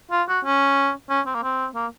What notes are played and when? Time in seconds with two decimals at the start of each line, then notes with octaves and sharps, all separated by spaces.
0.11 F4
0.28 F#4
0.45 C#4
1.10 C#4
1.26 C4
1.35 A#3
1.43 C4
1.75 A#3